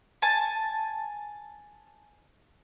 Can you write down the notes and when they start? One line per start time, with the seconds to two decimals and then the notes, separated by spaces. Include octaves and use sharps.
0.22 G#5 A5